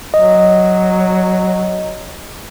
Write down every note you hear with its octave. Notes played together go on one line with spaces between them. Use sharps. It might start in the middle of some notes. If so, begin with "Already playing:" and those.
F#3 D#5